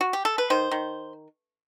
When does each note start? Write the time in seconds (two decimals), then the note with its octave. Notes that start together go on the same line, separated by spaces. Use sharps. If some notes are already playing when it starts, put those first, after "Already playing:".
0.01 F#4
0.13 G4
0.25 A4
0.38 B4
0.50 D#3 C5
0.71 D#3